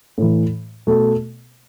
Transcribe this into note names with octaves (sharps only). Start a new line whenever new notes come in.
A2 E3
B2 A3